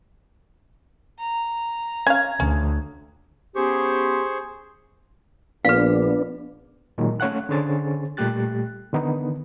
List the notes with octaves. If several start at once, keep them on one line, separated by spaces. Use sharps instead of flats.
A#5
C#4 F5 G#6
D2 C#4
B3 C#4 G4 G#4 C5 C#6
A#1 B3 D4 B4 F5
A#2 D#3 F#3 G#3 A#3
A3 C#4 C#5 F5 F#5 F#6
D3 C#4 G#4 C5 C#5 A6
A#2 G3 A3 G4 F#6 A6
D3 D#3 B3 D#4